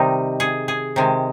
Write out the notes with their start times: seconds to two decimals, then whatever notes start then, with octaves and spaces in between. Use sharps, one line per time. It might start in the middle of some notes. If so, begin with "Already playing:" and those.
Already playing: C3 D#3 G3 D#4
0.40 G#4
0.68 G#4
0.96 C3 D#3 G#3